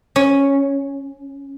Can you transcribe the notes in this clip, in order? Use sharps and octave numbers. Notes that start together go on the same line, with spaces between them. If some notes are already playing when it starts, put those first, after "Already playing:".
C#4